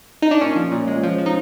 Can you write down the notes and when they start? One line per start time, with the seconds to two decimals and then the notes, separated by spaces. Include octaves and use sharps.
0.22 D#4
0.31 D4
0.41 A#2 C#4
0.56 F3
0.72 A#2
0.88 G#3
1.03 F3
1.18 F3
1.26 D#4